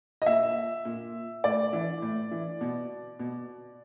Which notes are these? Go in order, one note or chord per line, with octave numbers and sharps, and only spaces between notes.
D#5
A#2 E5
A#2
A2 D5
E3
A2
E3
B2
B2